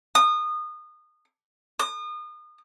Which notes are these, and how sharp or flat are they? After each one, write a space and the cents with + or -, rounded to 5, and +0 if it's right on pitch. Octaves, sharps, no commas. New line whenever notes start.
D#6 -25
D#6 -35